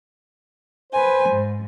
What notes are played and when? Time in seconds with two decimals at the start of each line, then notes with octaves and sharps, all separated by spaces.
0.93 B4 C5 G#5
1.28 G#2